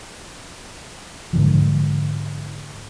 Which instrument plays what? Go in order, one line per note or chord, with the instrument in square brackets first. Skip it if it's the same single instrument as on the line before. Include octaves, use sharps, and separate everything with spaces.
[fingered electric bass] G#2 D3 F3